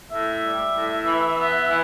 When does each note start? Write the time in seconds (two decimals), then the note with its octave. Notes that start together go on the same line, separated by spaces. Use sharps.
0.10 A2 E5
0.42 G3
0.74 A2
1.05 E3
1.36 B3
1.67 E3